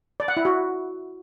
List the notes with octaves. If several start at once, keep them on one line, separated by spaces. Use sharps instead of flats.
D5
F#5
E4
F#4